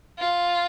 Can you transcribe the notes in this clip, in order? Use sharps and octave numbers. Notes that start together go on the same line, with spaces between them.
F4